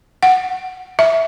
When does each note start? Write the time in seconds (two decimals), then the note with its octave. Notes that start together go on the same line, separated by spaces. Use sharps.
0.23 F#5
0.99 E5